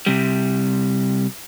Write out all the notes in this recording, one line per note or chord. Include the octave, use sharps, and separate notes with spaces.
C3 G3